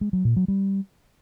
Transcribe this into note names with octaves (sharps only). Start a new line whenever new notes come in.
G#3
F#3
A#2
F#3
G3